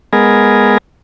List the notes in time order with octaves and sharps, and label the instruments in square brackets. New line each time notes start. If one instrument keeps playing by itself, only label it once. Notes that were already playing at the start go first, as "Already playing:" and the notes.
[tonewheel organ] G#3 B3 G#4 A#4